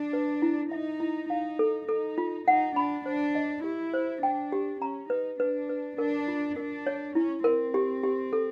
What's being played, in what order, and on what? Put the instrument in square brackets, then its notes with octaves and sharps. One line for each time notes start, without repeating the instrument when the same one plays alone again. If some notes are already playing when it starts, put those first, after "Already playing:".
Already playing: [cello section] D4
[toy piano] B4
E4
[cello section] D#4 [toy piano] E5
[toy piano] E4
[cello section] D#4 [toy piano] F5
[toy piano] A4
[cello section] D#4 [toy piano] A4
[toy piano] F4
[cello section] D#4 [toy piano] F#5
[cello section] D4 [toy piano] B5
[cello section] D4 [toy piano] C5
[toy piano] D#5
[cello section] E4 [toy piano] G4
[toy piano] C5
[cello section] D4 [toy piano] G5
[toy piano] G4
[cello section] C#4 [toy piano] A#5
[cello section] D#4 [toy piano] B4
[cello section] D4 [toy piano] B4
[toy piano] B4
[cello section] D4 [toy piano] A#4
[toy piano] F4
[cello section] D4 [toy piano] A#4
[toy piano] C#5
[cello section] C#4 [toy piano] E4
[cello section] C4 [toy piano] A#4
[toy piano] G4
G4
A4